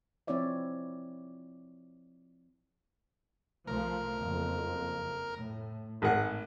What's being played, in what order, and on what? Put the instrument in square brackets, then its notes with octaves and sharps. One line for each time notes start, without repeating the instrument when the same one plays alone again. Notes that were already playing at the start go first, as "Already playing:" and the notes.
[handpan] F3 C4 E4 C#5 D5 E5
[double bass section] C2 F3 A3 [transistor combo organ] A#4
[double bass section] F#1 F2
A2
[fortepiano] G#1 G#4 F#5 [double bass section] A2